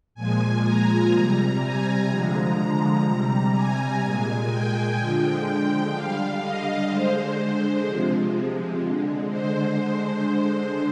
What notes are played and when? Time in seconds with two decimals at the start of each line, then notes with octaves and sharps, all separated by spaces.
0.15 A#2 F3 G#3 G#5
0.63 A#5
1.12 C3 G3
1.59 G#5
2.07 D3 F3 G#3 A#5
2.56 A#5
3.04 C3 G3
3.52 G#5
4.01 A#2 G#3
4.48 G5
4.97 D3 F3 G#3
5.92 D3 G3 F5
6.40 D#5
6.89 D3 G#3 C5
7.85 C3 F3 G#3
8.82 D3 G#3
9.29 C5
9.77 D3 G#3 C5